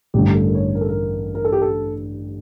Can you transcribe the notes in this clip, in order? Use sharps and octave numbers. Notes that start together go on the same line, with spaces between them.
A1 G2 D3 G4
A4
A#4
C#5
A#4
A4
A#4
A#4
A4
G4
A4